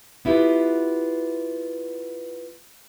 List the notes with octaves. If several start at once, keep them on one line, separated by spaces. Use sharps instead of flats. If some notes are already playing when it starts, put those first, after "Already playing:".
B3 E4 F4 G4 B4